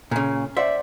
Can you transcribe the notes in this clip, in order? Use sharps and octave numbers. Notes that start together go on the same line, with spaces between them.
A#2 C#3
C5 D5 E5 F#5